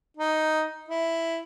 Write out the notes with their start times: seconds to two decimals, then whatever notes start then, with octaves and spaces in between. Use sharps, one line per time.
0.17 D#4
0.89 E4